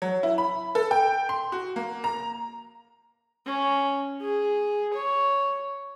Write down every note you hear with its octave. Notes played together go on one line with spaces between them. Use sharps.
F#3
E4
B5
A4
G5
C6
F#4
A#3
A#5
C#4
G#4
C#5